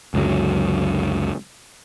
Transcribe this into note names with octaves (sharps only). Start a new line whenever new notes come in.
C#2 F#2 D3 F#3